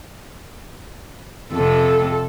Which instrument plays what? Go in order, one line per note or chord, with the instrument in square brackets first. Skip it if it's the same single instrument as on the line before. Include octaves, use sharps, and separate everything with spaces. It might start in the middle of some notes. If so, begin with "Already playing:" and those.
[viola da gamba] F2 C3 [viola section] A4